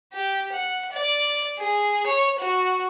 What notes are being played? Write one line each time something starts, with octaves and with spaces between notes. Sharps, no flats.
G4
F#5
D5
G#4
C#5
F#4